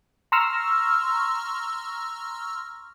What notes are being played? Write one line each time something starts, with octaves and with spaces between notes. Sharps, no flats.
A#5 C6 C#6 E6 F6 A#6